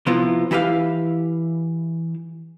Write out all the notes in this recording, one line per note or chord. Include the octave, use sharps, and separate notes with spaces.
C3 F3 B3 E4 F4
E3 E4 G4 B4 F5